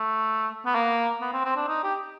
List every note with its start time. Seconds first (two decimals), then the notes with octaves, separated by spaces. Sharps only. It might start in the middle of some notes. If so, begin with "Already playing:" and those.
Already playing: A3
0.66 B3
0.75 A#3
1.21 B3
1.33 C4
1.45 C4
1.57 D4
1.68 D#4
1.83 G4